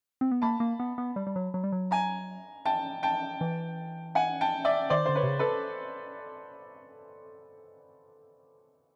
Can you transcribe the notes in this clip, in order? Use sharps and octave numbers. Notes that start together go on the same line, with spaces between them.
C4
B3
A#3 A5 B5
A#3
B3
B3
G3
G3
F#3
F#3
G3
F#3
G#5 A#5
G5 A5
G5 A5
E3
F#5 G#5
G5 A5
D5 E5
D#3 C5 D5
D3 C5
B4 C#5
C3
C#3
A4 B4